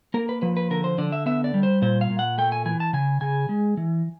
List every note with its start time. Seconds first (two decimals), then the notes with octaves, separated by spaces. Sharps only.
0.14 A#3 A#4
0.29 B4
0.42 F3 B4
0.57 B4
0.70 D3 A#4
0.84 C5
0.98 D3 D5
1.12 E5
1.26 B3 E5
1.44 D5
1.54 G3
1.63 C5
1.82 A#2 C5
2.01 F5
2.10 A#2
2.19 F#5
2.38 A3 G5
2.52 G#5
2.65 E3 G#5
2.80 A5
2.93 C#3 G#5
3.21 C#3 G#5
3.49 G#3
3.77 E3